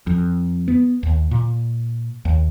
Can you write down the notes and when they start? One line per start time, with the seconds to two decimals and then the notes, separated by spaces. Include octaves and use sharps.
0.07 F2
0.68 B3
1.03 D#2
1.31 A#2
2.25 D#2